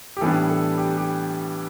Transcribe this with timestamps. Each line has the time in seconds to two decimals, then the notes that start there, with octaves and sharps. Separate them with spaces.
0.17 G4
0.21 A2 E3 G3 B3 D4 A4
0.49 A4
0.78 G4
0.97 G4